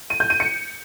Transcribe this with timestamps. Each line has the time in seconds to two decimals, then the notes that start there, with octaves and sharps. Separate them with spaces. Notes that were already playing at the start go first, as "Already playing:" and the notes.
0.10 D#7
0.20 G6
0.30 D#7
0.40 C#7